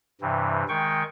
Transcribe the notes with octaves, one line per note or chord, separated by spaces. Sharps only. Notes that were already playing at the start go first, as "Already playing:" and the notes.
G2 C3 E3
D#3 G#3 G5 C#6